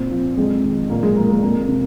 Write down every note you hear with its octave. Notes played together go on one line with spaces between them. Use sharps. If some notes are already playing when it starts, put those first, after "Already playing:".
Already playing: A#2 C4
F3
F2 G#3
D#3
A#2 A#3
G#3
F3 A#3
A#3
F2 A#3
C3